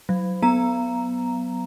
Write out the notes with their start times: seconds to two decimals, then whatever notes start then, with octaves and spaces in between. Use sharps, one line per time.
0.09 F#3
0.43 B3 A#5